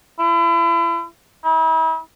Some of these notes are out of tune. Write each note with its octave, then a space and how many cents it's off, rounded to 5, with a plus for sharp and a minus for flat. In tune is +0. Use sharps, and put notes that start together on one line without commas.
E4 +35
E4 -40